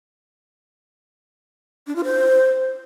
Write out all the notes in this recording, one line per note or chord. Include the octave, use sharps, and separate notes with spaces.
D4
F4
C5